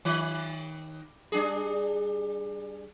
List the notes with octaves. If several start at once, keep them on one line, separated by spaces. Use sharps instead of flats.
D#3
G3 D4 G#4